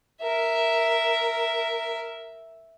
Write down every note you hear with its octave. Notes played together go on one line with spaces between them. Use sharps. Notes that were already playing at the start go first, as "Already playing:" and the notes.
A#4 E5